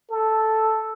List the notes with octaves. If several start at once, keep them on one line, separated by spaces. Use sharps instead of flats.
A4